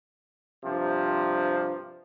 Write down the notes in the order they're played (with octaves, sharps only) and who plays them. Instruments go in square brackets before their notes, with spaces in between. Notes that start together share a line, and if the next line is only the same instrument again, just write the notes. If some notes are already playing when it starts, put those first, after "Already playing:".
[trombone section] G2 C3 F3